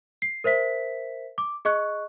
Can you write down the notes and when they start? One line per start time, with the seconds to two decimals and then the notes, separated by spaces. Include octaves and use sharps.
0.22 C7
0.44 A#4 C5 E5 B6
1.38 D6
1.65 G#4 D#5 C#6 F#6